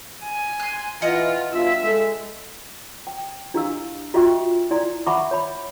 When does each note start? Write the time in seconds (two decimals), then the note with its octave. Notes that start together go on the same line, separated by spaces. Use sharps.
0.23 G#5
0.60 C6 F#6
1.02 E3 F4 D#5 F#5 A#5
1.53 G2 B2 F4 E5
1.83 G#3 A4
3.07 G5
3.54 D4 E4 G4 D#5 F5 E6
4.14 F4 F#4 D#5 E5 G5 C#6
4.71 E4 D5 G#5 C6
5.06 E5 F#5 A5 B5 C#6 D6
5.31 C#5 B5